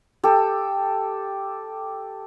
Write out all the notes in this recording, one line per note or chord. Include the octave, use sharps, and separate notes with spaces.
G4 A4